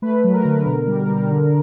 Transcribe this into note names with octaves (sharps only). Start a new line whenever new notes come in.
A3 B4
F#3
A#4
D3
B2
G3
G3
D3